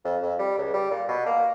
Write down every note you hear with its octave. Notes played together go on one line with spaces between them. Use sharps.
F2
F2
G3
C#2
G3
A#2
B2
A#3